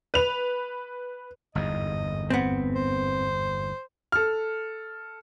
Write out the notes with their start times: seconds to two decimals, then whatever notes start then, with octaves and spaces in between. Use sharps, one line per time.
0.14 B4 F7
1.55 G1 E2 G#2 D#5
2.30 B3 C4
2.75 C5
4.12 A4 F6